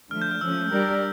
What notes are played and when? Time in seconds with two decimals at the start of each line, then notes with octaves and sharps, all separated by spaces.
0.11 D3 F3 A3 F6
0.22 G6
0.31 F6
0.41 F3 A3 C#4 E6
0.71 G3 D4 G4 A#4 D5